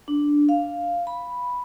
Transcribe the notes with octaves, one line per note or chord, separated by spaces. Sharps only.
D4
F5
B5